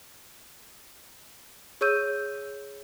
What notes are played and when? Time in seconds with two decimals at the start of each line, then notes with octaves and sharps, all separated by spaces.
1.81 G#4 C#5 C#6 E6 G6 D#7